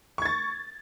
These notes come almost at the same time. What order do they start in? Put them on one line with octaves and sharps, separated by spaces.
C#6 G#6 A6